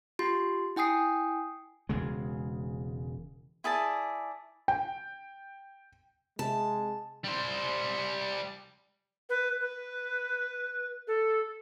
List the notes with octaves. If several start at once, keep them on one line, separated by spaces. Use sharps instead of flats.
F4 G4 C6
E4 G5 G#5 D#6 C7
E1 C#3 G#3
E4 G#4 D5 A5
G5
C3 G#3 A5
G3 C5
B4
B4
A4